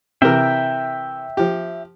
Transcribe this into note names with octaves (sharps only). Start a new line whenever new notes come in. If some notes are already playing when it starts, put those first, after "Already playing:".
C3 E3 A#4 E5 G5
F3 G4